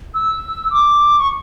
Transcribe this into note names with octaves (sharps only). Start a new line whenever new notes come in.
E6
D6
C#6